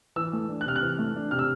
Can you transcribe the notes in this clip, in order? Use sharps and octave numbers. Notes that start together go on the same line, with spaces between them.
E3 E6
A3
D4
F#6
C3 F6
F#6
E3
A3
D4
C3 F6
E6